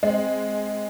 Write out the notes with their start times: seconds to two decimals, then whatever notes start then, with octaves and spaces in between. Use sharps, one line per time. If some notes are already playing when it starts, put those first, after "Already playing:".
0.03 G#3 C4